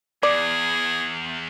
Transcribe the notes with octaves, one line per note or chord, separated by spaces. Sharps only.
E2 G#4 D5